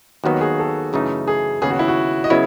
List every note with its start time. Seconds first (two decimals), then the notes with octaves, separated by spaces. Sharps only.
0.24 D#2 D#3 F#3 B3 D#4 F#4
0.41 G#4
0.59 A4
0.93 F#2 C#3 E3 A3 D#4
1.28 G#4
1.62 D#2 C#3 F#3 B3 G#4
1.70 F#4
1.79 E4
1.88 F#4
2.24 D#5
2.30 C#3 F#3 B3 E4 C#5